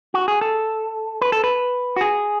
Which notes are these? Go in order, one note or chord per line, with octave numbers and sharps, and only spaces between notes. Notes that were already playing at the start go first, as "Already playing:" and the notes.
F#4
G#4
A4
B4
A4
B4
F#4
G#4